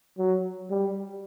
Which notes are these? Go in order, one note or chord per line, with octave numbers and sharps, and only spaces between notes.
F#3
G3